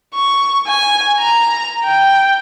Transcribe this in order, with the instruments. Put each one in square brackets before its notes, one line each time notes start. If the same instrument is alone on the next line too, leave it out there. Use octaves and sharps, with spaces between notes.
[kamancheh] C#6
G#5
A#5
G5